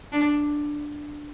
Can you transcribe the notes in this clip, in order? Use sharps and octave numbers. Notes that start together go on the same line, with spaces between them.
D4